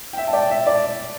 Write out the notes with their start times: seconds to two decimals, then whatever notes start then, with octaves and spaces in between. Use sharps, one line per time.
0.13 G5
0.18 E5
0.27 A5
0.33 D5 G5
0.50 E5
0.67 D5